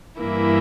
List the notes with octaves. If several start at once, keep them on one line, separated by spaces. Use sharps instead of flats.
G2 E3 A#3 E4